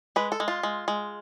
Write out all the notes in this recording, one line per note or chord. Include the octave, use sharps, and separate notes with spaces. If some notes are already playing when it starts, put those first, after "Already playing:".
G#3 B4
A4
G#3
F4
G#3
G#3